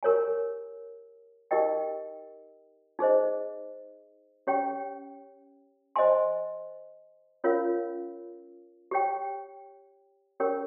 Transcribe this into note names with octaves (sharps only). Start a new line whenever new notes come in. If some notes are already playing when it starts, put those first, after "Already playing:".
G4 A#4 C#5 G#5
D#4 G4 A#4 D#5 G5
D#4 G#4 C5 D#5
C#4 G4 C#5 G5
C5 D#5 G#5 C6
C#4 F4 A#4 C#5 F5
G4 C#5 G5
C#4 G4 A#4 C#5 G5